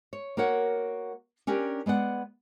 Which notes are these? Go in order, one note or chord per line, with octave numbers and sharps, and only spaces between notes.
C#5
A#3 F#4 A#4 C#5 F#5
C#4 D4 G4 A#4
G#3 B3 D5 F#5